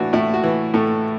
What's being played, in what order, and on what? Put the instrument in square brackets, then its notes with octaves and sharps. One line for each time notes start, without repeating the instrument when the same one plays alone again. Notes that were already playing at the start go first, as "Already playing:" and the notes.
Already playing: [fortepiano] A2 E3 D4 F#4
A2 E4
F#4
E3
A2 A4